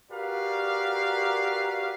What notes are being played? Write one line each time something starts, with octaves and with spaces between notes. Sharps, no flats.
F#4 G4 A#4 B4 D5 F5